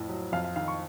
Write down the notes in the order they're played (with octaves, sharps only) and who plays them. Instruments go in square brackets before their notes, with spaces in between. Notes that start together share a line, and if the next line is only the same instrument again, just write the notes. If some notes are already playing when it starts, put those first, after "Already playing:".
Already playing: [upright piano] F2 A2
F#3
F2 F5
F5
D#3 F5
C#6